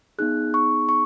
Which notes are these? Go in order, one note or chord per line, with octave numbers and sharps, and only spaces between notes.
B3 D#4 G#4 F#6
C#6
C#6